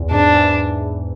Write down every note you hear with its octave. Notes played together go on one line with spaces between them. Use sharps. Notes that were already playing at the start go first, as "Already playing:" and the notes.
Already playing: E2
G#2 D4
E3